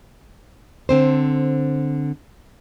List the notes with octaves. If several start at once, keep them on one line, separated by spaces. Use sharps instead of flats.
D3 C4 C5